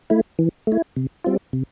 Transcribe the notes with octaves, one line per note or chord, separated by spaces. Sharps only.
A3 E4
E3
A3 E4
C3
G3 C4 F4
C3